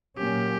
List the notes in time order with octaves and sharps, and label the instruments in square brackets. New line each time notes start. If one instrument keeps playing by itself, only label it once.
[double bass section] A#2 F#3 A#3 C#4 [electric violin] G4